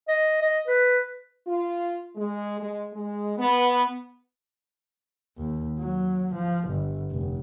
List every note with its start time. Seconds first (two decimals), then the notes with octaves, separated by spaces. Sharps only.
0.08 D#5
0.42 D#5
0.67 B4
1.46 F4
2.15 G#3
2.59 G#3
2.93 G#3
3.37 B3
5.37 D#2
5.80 F#3
6.35 F3
6.69 G1
7.12 F1